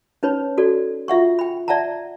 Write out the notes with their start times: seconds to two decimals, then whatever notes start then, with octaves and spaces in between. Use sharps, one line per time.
0.23 C#4 D#4 B4 C#5 B5
0.58 F#4 A4 D5
1.08 F4 E5 F#5 C#6
1.39 G5 B5
1.68 D5 E5 F#5 A5 A#5